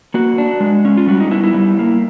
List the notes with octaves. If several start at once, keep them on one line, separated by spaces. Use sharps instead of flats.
A#3 F#4
D4
G#3
C#4
F4
G3 F#4
D#4
B3 E4
E4
G3
A#3